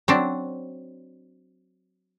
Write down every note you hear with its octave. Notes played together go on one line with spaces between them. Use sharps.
F#3 C4 D4